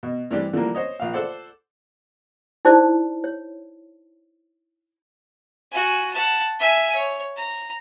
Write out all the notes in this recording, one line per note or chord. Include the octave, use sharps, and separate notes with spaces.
B2
G2 E3 G3 C4 D4 G4
D3 E3 F3 G3 A#3
C5 C#5 D#5
A#1 F5
A4 C5 D5 F#5
D#4 E4 G#4 C5 D5 A5
C#5
F#4 G#5
F#5 A5
E5 G#5
C#5
A#5